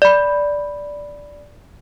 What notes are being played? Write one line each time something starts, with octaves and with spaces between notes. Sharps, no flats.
D5 B5